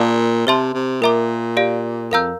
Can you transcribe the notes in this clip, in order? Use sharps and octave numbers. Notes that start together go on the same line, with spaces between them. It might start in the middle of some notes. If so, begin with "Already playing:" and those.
Already playing: A#2 A#4 D5 F5 A5 D6
C3 C5 E5 A5 C6
C3
A#2 A#4 E5 A#5 D6
G4 D5 F5
F2 A#4 F5 A#5 E6 G6